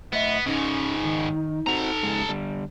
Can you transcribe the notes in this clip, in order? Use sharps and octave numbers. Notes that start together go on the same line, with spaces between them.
A2 B3 D#5 E5
G#2 C#3 C#4 D#4
D#3
C4 F#4 A4 A#5
G#2 C#3 G#3
D3 G3 D4